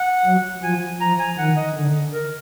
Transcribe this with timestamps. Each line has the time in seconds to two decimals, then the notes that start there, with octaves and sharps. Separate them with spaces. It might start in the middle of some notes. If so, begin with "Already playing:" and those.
Already playing: F#5
0.25 F#3
0.62 F3 G#5
1.01 F3 A#5
1.20 G#5
1.38 D#3 F#5
1.57 D#5
1.75 D3
2.13 A#4